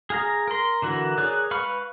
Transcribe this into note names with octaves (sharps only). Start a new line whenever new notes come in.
G#4 F5 A#5
A#4 C6
D3 E3 F#4 A#4
G#4 A#4 C#5 D5 F#6
B4 F5 B5 C#6 F6